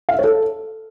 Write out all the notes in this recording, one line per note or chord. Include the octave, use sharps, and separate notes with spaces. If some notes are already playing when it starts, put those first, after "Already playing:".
F5
E5
C#5
A4